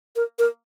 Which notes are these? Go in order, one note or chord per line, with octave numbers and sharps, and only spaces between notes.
A#4
A#4